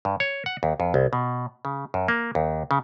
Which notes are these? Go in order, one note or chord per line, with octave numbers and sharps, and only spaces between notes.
G2
C#5
F#5
D#2
F2
C2
B2
C#3
F#2
A#3
D#2
C#3